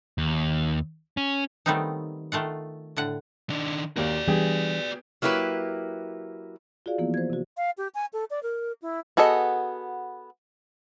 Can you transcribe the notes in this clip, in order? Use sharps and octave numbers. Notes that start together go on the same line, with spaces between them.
D#2
C#4
D#3 G3 A3 B3 C4 D#4
D#3 A3 F4 F#5
A2 D3 F#5
D#3 D4
D#2 A#3 F#4 D5
E3 G3 B3 D4 G4 G#4
F#3 A#3 E4 G4 B4
F4 F#4 G#4 D5 F5
E3 F3 A#3 B3 E4
C5 G#6
C3 F#4
F5
G4
G#5
A4
D5
A#4
E4
B3 F#4 G#4 A4 D#5